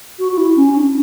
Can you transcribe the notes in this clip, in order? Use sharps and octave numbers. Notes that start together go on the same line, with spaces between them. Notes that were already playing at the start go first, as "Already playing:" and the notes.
F#4
F#4
E4
C#4
D4